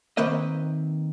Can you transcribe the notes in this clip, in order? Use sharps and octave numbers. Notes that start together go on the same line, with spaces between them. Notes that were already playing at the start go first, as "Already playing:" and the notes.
D#3 A#3 C4 B4 D#5